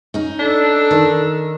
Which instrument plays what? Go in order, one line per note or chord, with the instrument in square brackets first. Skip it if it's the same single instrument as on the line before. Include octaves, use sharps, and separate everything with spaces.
[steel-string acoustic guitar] C#4 D#4
[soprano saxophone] D4 [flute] A4
[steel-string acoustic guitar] D#3